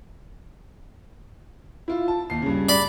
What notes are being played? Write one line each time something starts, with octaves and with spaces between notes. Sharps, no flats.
E4 F4
A5
D#2 C7
G2 C#3
D5 B5